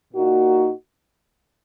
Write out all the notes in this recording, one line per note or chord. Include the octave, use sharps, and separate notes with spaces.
A#2 A#3 D#4 F#4